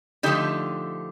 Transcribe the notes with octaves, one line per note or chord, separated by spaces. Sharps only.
D3 F3 A3 D#4 G4